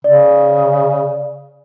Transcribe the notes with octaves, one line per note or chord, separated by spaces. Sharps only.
C#3 D5